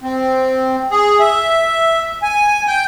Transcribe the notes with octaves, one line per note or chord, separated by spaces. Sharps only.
C4
G#4
E5
G#5
G5